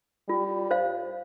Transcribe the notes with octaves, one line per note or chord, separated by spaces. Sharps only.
G3 F4
C5 F5